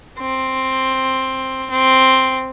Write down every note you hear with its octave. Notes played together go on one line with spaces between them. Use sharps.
C4
C4